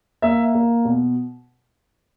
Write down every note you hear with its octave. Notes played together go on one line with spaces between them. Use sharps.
A#3 E5
A#3
B2